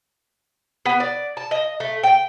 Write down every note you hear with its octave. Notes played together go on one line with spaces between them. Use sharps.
B3
D5
A5
D#5
A3
G5